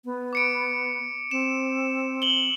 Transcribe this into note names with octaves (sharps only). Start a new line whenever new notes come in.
B3
D6 C#7 D7
C4 E7
F#7 G7